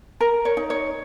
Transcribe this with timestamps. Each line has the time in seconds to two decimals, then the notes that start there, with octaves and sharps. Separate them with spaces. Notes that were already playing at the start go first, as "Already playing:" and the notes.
0.21 A#4
0.45 C#5
0.57 D#4
0.70 C#5